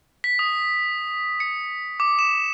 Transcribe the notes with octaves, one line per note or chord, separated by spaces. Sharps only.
B6
D#6
C#7
D6
E7